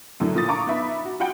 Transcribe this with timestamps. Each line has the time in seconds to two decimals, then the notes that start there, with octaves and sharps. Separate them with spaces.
0.20 F#2 A2 D3
0.35 A#2 F3 D#6 A6
0.48 F5 A#5 C#6 D6
0.67 B3 D#4 E5 B5
1.05 F#4
1.20 F4 F#4 F#5 G5